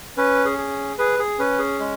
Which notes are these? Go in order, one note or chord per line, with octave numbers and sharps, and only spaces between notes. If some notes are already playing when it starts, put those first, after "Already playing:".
C#4 B4
G#4
G#4
G#4 B4
G#4
C#4 B4
G#4
G#3